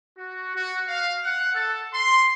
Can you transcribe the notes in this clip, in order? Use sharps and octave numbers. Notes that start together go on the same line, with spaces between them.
F#4
F#4
F5
F#5
A4
C6